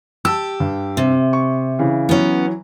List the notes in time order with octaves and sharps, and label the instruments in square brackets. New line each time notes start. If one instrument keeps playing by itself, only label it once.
[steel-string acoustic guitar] G4 [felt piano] A5 E6
[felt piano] G2
[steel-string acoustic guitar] C3
[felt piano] C#6
C#3 E3
[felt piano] E3 F#3 [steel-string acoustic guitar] B3 C#4